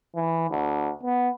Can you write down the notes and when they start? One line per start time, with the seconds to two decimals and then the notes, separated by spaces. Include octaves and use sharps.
0.15 E3
0.50 D2
1.03 B3